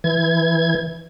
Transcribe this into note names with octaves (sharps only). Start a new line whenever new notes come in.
E3 G#6